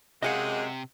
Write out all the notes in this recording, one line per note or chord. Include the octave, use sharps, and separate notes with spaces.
F#2 C3 G#3 D#5 F5 F#5